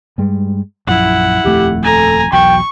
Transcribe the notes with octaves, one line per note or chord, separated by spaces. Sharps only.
G2 G3 G#3
A#1 F#2 F3 E4 F#5
D#1 F2 A3 G4
A4 G#5 A#5
B1 E2 F#3 G5 C#6